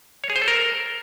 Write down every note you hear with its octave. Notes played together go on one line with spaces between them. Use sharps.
C#5
G#4
C5
A4
A#4